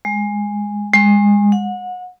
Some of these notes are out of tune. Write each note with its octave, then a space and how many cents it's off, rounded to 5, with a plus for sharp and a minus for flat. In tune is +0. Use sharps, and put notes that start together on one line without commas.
G#3 -10
G#3 -25
F#5 -30